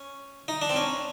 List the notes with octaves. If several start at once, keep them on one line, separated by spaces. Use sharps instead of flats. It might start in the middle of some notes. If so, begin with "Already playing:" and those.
Already playing: C#4
D#4
D4
C4
C#4